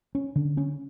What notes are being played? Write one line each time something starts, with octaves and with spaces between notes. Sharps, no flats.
C#4
D3
C#4